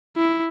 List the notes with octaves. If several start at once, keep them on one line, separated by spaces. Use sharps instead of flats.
E4